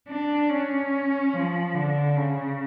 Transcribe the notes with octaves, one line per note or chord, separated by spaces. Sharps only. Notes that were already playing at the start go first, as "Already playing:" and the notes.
D4
C#4
F3
D3
C#3